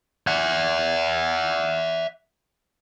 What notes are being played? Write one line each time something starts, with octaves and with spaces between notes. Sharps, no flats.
E5 F#5